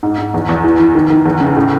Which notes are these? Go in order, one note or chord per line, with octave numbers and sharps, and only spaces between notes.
G#2
G#2
E2
E2
E3
E3
D#3
D#3
E2
C#3
A2